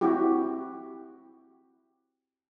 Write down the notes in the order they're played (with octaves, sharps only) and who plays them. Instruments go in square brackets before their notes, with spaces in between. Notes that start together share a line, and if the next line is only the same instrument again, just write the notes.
[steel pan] C4 E4 F#4 G4